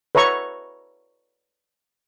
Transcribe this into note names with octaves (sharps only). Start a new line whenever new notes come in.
B4 C#5 E5 A#5 C#6